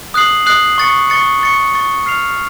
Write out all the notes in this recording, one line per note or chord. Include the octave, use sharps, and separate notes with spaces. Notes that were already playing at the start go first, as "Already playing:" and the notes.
D#6 F#6 C7 F#7
D#6 F#6 C7 F#7
C#6 A6 C#7
C#6 A6 C#7
C#6 A6 C#7
C#6 A6 C#7
F6 C7 F7